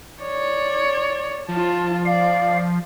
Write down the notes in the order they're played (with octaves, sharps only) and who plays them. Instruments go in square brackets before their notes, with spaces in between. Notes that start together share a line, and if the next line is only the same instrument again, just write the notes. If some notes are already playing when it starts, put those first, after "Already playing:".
[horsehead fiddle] C#5 D5
[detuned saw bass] F3 [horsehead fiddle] F4 A5
[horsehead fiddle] D5 [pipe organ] F5